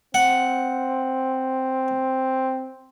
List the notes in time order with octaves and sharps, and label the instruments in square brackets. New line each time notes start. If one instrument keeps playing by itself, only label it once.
[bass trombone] C4 [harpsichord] F#5